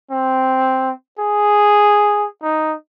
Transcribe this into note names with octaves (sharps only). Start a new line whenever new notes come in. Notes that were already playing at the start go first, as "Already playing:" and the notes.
C4
G#4
D#4